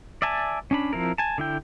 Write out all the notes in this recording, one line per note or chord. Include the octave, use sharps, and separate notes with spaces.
D5 E5 G#5 A5
C#4 D4 B5
F3 C4 E4 A#4
G#5 A5
D3 E4 G5